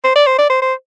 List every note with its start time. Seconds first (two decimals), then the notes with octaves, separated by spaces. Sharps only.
0.04 C5
0.16 D5
0.27 C5
0.38 D5
0.49 C5
0.62 C5